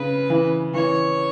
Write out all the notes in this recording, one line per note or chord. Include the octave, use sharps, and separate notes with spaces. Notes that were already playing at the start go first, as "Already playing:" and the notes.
Already playing: C#3 B4
E3
E3 C#5